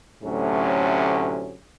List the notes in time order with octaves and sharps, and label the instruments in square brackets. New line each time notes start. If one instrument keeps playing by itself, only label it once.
[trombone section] D2 A2 C3 F#3 C#4